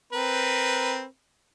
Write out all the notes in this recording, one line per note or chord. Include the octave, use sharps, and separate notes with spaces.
C4 A#4 B4